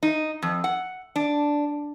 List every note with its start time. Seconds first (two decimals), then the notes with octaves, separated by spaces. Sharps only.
0.03 D#4
0.42 F2
0.64 F#5
1.16 D4